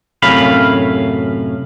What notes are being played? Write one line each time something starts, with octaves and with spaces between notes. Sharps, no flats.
F#2 A2 C3 C#4 F5 B5